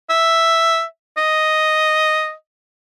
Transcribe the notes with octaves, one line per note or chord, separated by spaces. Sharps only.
E5
D#5